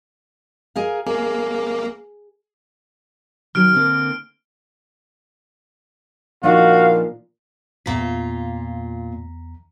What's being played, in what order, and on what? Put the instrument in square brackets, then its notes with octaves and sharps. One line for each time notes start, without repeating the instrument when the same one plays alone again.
[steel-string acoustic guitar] G#4 A#4 F5
[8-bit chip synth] A#3 [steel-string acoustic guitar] G#4
[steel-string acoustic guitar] D#3 F#3 C#4 [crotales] F6 D7
[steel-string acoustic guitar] D3 A#3 C4
[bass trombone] A#2 [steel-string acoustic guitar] F3 D4 D#4 [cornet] F#4 [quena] F5
[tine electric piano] E2 A#5 B6 [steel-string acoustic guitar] A#2 F4